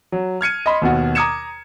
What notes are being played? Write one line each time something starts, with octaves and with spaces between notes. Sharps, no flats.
F#3
F6 G#6 C#7 D#7
D#5 B5 C6
D#2 B2 F#4
A#5 D6 D#6 G#6 C#7 E7